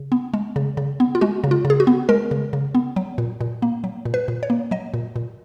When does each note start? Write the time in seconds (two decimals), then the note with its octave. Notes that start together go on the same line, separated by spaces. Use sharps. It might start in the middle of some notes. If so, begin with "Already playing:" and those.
Already playing: C#3
0.12 B3
0.34 G#3
0.56 C#3
0.77 C#3
1.00 B3
1.15 F4
1.21 G#3 F#4
1.44 C#3
1.51 F4
1.65 C#3
1.70 G#4
1.80 F#4
1.87 B3
2.09 G#3 A#4
2.31 C#3
2.53 C#3
2.75 B3
2.96 F#3
3.18 A#2
3.41 A#2
3.62 A#3
3.84 F#3
4.05 A#2
4.14 B4
4.28 A#2
4.43 C#5
4.50 A#3
4.71 F#3 D#5
4.94 A#2
5.16 A#2